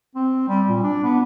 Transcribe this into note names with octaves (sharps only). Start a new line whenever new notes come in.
C4
G3
A#2
D4
B3